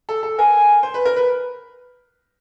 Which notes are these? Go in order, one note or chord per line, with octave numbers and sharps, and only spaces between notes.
A4
A4
A#4 G#5
C5
B4
A#4
B4